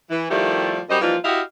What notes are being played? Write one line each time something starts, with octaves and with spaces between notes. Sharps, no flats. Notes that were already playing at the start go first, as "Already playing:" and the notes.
E3
D#3 F3 G3 A3 E4 G4
F#2 G3 C5 D#5
E3 F3 G3 A#3 D#4 F4
E4 F#4 G4 D#5 F5